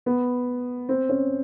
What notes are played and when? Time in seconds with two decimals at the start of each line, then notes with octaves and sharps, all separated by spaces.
0.06 B3
0.89 C4
1.09 C#4